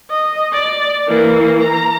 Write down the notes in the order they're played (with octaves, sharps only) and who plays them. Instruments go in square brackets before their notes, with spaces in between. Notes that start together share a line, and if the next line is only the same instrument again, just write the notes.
[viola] D#5
D5
E3 A#3
A#5